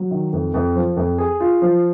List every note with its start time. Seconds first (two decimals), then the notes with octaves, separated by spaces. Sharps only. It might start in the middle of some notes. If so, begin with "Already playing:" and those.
Already playing: F#3
0.11 D#3
0.33 F2
0.54 F2
0.76 F3
0.97 F2
1.18 G#4
1.40 F4
1.62 F3